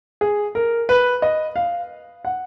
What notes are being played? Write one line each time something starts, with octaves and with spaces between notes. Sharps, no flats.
G#4
A#4
B4
D#5
F5
F#5